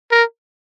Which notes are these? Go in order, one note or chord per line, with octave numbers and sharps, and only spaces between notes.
A#4